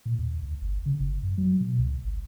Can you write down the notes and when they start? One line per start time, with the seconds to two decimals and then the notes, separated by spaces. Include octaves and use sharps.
0.06 A#2
0.19 D#2
0.43 D2
0.62 G1
0.86 C#3
1.00 G1
1.23 F#2
1.38 F#3
1.60 B2
1.79 C#2
2.05 G#1